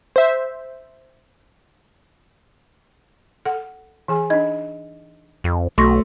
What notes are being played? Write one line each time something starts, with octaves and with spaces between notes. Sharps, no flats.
C5 E5
A4 F#5
E3 G#4 G#5
D4 D#4 D#5 G#6
F2
B1 A3 F#4 C6 C#6 A#6